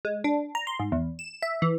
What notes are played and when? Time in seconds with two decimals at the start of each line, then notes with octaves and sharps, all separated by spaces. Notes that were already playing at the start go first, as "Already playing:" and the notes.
0.05 G#3
0.24 D4
0.55 A#5
0.67 C6
0.79 G#2
0.92 E2
1.19 E7
1.42 E5
1.62 E3